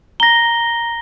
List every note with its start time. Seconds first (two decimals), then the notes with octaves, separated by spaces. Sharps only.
0.20 A#5 A#6 G7